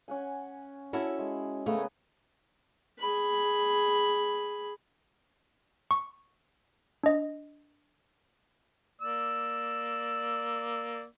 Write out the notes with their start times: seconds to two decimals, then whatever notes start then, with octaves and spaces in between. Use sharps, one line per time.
0.08 C#4 F#5 G#5
0.93 C#4 E4 F#4 A4 A5
1.19 G#3
1.66 C#3 A3 B3 A#4 C#5
2.99 G#4 B5
5.91 C#6
7.03 D4 D#5
9.02 A#3 D5 E6